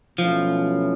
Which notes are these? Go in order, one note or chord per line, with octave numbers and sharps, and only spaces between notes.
B2 F3 F#3 A3 C#4 E4